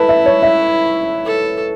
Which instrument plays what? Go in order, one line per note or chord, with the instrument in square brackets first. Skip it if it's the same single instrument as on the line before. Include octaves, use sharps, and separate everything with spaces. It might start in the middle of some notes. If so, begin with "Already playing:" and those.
Already playing: [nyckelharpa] E4 [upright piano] A4 B4 A5
[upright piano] E5
C#5
E5
[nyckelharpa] A4